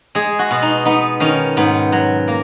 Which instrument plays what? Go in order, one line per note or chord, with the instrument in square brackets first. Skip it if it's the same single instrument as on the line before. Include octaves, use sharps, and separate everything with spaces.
[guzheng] G#3 G#4
F#4
B2
D#4
B3 D#4
D#3 C#4
G#2 B3
F#3
A#3